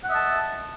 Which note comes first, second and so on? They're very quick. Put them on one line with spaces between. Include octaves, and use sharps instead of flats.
F#5 E5 D#5 A5